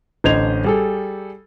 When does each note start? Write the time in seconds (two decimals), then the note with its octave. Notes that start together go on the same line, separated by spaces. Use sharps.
0.24 A1 D3 C5 D#5 G#6 F7
0.64 G3 G#4 A4